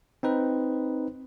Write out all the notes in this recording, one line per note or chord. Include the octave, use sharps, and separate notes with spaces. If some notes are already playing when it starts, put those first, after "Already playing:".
C4 D#4 B4